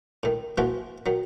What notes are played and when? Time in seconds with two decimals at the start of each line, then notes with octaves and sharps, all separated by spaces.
0.23 A2 D#3
0.58 E3 F3 A#3 F4 F#4
1.06 D#3 F#3